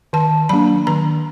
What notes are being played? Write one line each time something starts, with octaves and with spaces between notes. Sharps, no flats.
D#3 A5
F#3 A#3 D4 B5
D#3 A#5